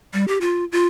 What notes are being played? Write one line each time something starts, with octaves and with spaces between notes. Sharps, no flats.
G3
G4
F4
F4